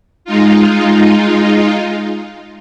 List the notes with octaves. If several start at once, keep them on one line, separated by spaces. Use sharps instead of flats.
G#3 D#4 F4